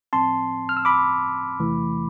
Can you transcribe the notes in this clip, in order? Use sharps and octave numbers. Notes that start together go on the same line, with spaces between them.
A2 F3 C4 A5 C6
F6
E6
B5 D6
E2 C3 E3 A3